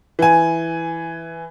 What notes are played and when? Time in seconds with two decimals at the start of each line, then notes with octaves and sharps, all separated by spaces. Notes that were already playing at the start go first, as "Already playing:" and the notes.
0.19 E3 G#5